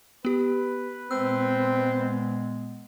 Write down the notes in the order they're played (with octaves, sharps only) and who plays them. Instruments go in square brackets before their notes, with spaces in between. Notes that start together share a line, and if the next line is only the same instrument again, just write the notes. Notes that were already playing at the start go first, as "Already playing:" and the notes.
[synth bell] B3 G4 [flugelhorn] B4
[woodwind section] A#2 G#3 B3 [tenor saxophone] C4 [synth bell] E6